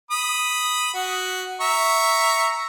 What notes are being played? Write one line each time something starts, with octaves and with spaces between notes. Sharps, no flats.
B5 D#6
F#4
E5 A#5 C#6